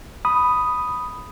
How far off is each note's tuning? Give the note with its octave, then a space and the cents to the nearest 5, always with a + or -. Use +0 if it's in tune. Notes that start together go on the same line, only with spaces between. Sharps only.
B5 +0 D#6 +0